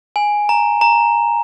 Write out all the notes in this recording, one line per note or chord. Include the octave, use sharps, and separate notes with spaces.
G#5
A#5
A#5